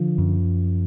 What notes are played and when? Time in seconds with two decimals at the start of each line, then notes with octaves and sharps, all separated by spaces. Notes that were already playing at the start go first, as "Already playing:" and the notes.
Already playing: D3 F3
0.18 F#2